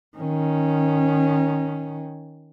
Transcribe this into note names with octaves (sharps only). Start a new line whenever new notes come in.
D#3 C#4